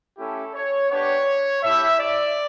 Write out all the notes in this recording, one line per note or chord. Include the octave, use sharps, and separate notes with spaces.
A3 C#4 E4 G4 A4
C#5
B3 D4 G4 C#5
A3 E4 G4 E5
D5